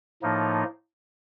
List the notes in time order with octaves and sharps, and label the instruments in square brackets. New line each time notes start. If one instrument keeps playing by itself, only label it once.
[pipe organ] A2 F3 A#3 D#4